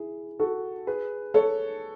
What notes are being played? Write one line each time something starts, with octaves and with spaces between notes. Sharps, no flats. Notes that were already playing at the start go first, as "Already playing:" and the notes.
Already playing: E4 G#4
F#4 A4
G#4 B4
A4 C#5